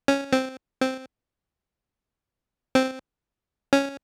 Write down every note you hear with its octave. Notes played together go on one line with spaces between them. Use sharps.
C#4
C4
C4
C4
C#4